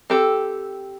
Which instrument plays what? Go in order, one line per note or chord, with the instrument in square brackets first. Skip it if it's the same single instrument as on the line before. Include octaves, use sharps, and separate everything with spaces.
[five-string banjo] C4 G4 A4